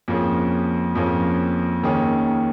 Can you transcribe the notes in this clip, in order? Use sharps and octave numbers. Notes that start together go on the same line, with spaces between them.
F2 F3 A#3 C#4 G#4
F2 F3 A#3 C#4 G#4
D#2 D#3 A#3 C#4 G#4